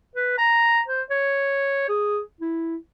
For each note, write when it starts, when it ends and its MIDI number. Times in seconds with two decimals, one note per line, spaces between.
0.15 0.36 71
0.38 0.80 82
0.88 1.02 72
1.11 1.87 73
1.89 2.20 68
2.41 2.76 64